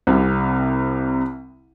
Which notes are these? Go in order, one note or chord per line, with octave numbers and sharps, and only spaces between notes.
C2 C3 C4